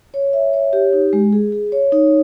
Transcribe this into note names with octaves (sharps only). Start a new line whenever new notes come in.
C#5
E5
C#5
G4
D#4
G#3
G#4
G#4
C#5
D#4